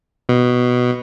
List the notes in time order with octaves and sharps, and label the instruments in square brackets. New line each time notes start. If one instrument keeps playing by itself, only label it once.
[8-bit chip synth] B2